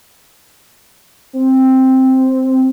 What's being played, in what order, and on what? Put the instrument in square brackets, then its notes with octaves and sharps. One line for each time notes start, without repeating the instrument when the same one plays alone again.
[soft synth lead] C4